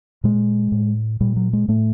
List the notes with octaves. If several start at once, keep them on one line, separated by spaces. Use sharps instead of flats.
A#2 G#3
A2
A#2 G3
F#3
G#3
A2 A3